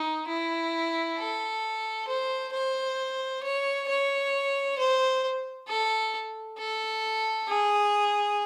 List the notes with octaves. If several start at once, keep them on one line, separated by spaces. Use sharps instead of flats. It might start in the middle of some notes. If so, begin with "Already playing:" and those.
Already playing: D#4
E4
A4
C5
C5
C#5
C#5
C5
A4
A4
G#4